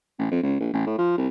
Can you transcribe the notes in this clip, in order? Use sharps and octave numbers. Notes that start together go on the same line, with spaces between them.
A1
F2
C#2
A#1
A1
A2
F3
C2